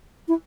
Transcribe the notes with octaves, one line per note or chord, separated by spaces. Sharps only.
E4